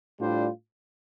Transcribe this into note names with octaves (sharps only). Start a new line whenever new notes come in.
A2 G3 D4 F4 C5